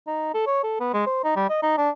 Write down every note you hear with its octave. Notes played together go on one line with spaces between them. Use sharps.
D#4
A4
C#5
A4
B3
G#3
C5
D#4
G3
D#5
D#4
D4